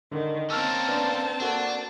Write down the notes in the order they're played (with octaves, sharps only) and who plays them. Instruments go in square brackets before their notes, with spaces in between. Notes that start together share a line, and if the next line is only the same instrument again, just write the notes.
[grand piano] D3 [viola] D#3
[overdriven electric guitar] A#3 C#4 [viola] C4 A5 [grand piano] E6 F6
[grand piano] B3 D4
[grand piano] A#3 F#4 A4 [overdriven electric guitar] D4